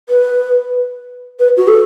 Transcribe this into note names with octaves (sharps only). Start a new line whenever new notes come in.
B4
B4
F#4
A4